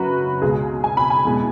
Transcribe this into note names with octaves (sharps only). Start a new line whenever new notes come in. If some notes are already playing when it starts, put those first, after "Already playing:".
Already playing: F#2 C#3 F#3 F#4 B4
C#2 B2 G#3 G#4
G#5
B5
G#5
E2 B2 G#3